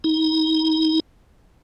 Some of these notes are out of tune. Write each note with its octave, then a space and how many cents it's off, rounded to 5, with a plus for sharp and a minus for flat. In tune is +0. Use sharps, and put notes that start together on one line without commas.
D#4 +30